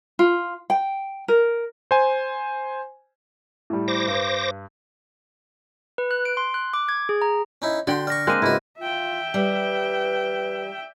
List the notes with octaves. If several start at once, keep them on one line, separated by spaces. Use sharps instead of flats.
F4
G5
A#4
C5 G#5
A2 G3
C5 D6 A#6
G2
B4
F#6
D7
C6
F#6
D6
G#6
G#4
A#5
C#4 D#4 E4
D3 F#4 G5 C6
D5 C#6 F6 A#6
G#3 A#3 C4 F#6 D#7
C#2 G#2 E4 F#4
F4 E5 G5
G3 B4